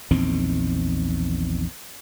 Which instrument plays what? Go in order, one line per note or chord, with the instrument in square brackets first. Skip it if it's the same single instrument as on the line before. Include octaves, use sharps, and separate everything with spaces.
[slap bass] A#1 E2 D#3 C4